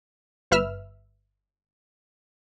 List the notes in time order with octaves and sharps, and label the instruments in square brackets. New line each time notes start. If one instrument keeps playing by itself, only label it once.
[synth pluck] G1 B4 E5 E6 F6